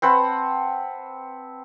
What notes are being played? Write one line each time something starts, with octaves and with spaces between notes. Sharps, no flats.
C4 B4 F#5 A5